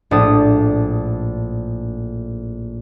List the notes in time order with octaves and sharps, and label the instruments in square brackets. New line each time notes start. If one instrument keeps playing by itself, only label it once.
[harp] A#1 A2 D4 A5 D#6